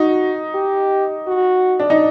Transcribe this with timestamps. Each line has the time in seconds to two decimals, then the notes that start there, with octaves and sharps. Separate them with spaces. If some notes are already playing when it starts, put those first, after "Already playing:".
Already playing: D#4 F#4
0.55 G4
1.27 F#4
1.80 D4
1.90 D#4